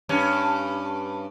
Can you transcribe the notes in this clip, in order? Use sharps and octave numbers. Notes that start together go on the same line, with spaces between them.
G2 C#4